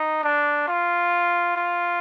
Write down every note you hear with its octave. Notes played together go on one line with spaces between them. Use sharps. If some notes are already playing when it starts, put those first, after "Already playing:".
Already playing: D#4
D4
F4
F4